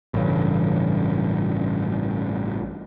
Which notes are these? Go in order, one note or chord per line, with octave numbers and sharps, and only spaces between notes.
A1 G2 C#3